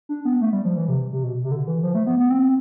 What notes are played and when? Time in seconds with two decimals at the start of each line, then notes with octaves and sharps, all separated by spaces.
0.09 D4
0.25 B3
0.41 A3
0.53 G3
0.65 F3
0.77 E3
0.88 C3
1.12 C3
1.23 B2
1.44 C3
1.51 D3
1.67 E3
1.83 F3
1.95 A3
2.07 B3
2.19 B3
2.30 C4